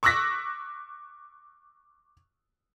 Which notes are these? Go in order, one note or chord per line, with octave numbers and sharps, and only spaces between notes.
C#6 D6 E6 F#6 A#6 B6